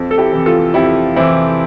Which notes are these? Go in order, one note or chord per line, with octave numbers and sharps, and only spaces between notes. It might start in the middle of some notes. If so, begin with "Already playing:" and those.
Already playing: F2
A4
E4 G4
C3 E3
F4 A4
F2 E4 G4
C3 E3 C4 E4